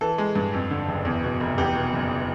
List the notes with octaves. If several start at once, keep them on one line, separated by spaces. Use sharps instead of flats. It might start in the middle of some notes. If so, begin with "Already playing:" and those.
E3 A4
G#3
G2
F2
D3
F#1
E2
B2
F1
E2 G4
B2
F#1